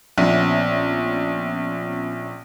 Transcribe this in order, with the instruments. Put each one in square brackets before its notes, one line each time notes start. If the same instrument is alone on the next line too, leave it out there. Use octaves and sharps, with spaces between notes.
[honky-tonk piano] A#1 [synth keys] B3 C#4 E5